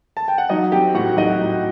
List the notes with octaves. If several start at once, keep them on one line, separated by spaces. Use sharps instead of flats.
A5
G5
F#5
F#3 D#4 D#5
C4 G4 G5
A2 F#4 F#5
F#3 D#4 D#5
A2